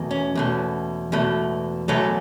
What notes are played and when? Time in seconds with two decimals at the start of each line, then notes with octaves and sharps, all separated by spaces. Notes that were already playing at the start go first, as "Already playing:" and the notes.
Already playing: E2 B2 A3
0.11 C#4
0.35 E2 B2 A3
1.12 E2 B2 A3
1.88 E2 B2 F#3 A3 B3